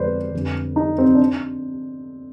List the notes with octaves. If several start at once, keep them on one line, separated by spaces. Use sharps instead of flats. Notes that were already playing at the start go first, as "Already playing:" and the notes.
Already playing: F2 D3 G#3 B4 C5 D5
F2 D3 G3
D#4
C4
D4